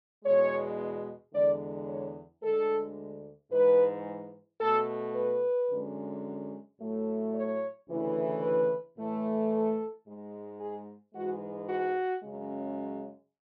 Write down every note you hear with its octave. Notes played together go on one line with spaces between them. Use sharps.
E2 B2 G#3 C#5
E2 D3 G#3 D5
C#5
D2 D3 G#3 A4
G#2 E3 G#3 B4
B2 A3 A4
B4
F#2 D3 G#3
A2 F#3 A3
C#5
D2 C#3 E3 A3
B4
A2 E3 A3
A4
G#2 G#3
G#4
G#2 E3 G#3 F#4
F#4
F#2 C#3 G#3